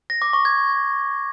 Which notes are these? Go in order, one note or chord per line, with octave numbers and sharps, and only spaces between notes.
A#6
D6
C#6
G#6